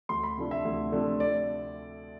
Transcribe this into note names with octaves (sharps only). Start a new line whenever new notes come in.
D2 C6
B5
C3 F3 A3 D4
E5
D2
C3 F3 A3 D4
D5